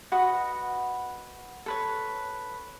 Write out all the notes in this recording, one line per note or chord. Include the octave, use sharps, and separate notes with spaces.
F#4 B4 D#5 F#5
A4 B4 C#5